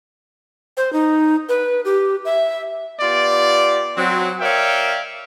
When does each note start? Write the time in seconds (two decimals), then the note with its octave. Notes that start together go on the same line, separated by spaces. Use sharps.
0.77 C5
0.93 D#4
1.49 B4
1.85 G4
2.25 E5
3.00 B3 F4 G4 D5
3.97 F#3 C4
4.41 A#4 C#5 D5 E5 F5 G5